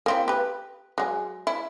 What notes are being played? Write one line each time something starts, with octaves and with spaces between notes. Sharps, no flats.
A#3 C4 E4
G4 B4
F#3 G#3
E4